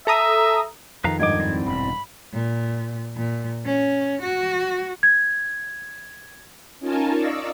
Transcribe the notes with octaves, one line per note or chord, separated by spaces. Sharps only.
A4 E5 A#5 D#6
F2 D#3 B4 F5 A#5
G#1 G2 D4 D#5 D6 G#6
C4 E4 D5
E1 B5
A#2
A#2
C#4
F#4
G#6
C#4 D#4 F4 A#4 G#5 A5
D5 D#5 F5 A#5 C#6 E6